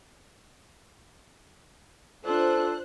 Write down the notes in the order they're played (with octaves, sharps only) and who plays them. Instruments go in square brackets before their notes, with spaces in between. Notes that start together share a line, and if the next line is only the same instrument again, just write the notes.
[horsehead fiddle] D4 F4 [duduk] A4 [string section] C5 F#6